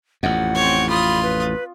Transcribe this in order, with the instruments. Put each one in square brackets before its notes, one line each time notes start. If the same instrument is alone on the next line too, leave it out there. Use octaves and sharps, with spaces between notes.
[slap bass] A1 F2 [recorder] F#5
[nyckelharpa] C4 C#5
[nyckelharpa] F4 D#6 [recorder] B5
[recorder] B4